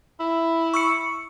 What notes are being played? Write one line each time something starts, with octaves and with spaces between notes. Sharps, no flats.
E4
C#6 E6 C#7